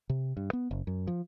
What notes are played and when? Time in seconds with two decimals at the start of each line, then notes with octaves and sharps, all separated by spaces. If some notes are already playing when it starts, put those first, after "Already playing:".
0.10 C3
0.37 G2
0.53 B3
0.71 F#1
0.87 F#2
1.07 F3